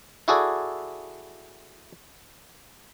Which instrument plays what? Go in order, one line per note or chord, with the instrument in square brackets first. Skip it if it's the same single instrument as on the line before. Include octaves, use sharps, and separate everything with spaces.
[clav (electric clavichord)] E4 F#4 G#4 A4 D5